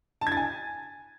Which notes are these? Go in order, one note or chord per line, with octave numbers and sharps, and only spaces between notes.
A5
G#6
A6
G#5